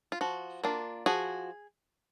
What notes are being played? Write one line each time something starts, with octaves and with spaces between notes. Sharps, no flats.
F4
F3 F#4
A#3 D4 F4
F3 F#4 G#4